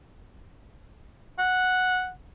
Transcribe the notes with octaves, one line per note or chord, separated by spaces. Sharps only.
F#5